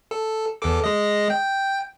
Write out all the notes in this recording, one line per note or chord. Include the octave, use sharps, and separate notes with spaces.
A4
E2 A4 D6
G#3 D#5
G5